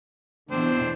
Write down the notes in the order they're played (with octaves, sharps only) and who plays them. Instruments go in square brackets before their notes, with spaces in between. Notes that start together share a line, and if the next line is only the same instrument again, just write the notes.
[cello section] E2 B2 D3 [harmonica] C4 D4 C5